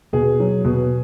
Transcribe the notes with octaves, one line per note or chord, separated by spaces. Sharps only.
B2 G#4
F#3
B2